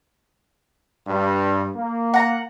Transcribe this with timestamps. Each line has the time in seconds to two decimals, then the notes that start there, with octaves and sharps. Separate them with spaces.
1.07 G2
1.76 A#3
2.14 F#5 A#5